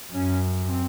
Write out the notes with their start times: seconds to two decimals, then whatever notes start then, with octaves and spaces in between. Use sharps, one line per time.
0.13 F#2 C#4
0.68 C4